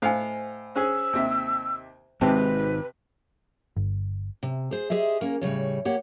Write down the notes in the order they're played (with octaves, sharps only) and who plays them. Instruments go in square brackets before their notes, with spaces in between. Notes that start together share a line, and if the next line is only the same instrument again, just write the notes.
[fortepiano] A2 F5 [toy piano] C5 D#5 G#5
[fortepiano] C#4 G#4 [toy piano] C5 [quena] E6
[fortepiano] D#2 C3 E5
[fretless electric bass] G#1 G#2 C4 [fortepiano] C3 G4 A5 [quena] B4
[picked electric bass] G1
[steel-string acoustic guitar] C3
G#4 C5
G4 G#4 C5 D#5 E5
A#3 C#4 A#4
A2 C#3 G3 C#5
A#3 G4 C#5 F#5